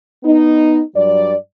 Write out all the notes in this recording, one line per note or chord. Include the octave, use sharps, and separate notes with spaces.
B3 D#4
G2 F#3 D5